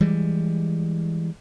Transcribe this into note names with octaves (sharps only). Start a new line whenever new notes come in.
E3 G3 G#3